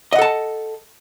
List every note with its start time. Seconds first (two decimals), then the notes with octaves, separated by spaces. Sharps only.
0.13 D#5
0.16 F#5
0.19 A4
0.22 A5